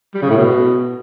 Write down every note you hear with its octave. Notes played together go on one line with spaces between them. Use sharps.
G3
C#3
A2
B2